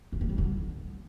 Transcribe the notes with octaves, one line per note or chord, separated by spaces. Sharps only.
D4
A#3
G3
D3